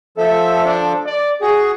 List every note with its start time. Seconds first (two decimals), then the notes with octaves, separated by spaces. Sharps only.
0.18 F3 A4 E5
0.65 D4
1.06 D5
1.41 F#4 G#4